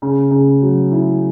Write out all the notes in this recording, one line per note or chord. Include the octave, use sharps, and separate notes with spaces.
C#3
C#3
F#3
E4